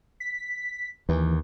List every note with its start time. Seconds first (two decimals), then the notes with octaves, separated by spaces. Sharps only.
0.20 B6
1.09 D#2 E3